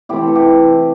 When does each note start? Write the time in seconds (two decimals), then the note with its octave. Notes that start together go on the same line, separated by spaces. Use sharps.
0.09 C3 E3 A3 C4 E4 G4
0.27 A4
0.35 E4 G4